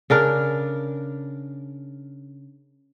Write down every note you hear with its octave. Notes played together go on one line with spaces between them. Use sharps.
C#3 D4 A#4